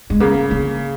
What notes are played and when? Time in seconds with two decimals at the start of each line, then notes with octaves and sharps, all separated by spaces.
0.10 G#3
0.20 C#3 A#3
0.51 A#3